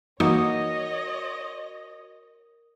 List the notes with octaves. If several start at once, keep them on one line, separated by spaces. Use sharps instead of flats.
E3 A#3 D#4 F#4 A#4 C#5 D#5 D#6